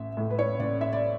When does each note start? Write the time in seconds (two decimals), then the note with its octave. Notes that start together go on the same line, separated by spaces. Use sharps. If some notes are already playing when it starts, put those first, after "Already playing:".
Already playing: A1 E5
0.17 A2
0.30 B4
0.39 C#5
0.59 A1 D5
0.81 E5
0.93 D5